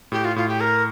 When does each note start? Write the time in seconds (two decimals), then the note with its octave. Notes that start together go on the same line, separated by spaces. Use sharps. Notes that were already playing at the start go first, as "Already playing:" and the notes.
0.12 A2 G4
0.24 F4
0.36 A2 F4
0.48 G4
0.60 A#4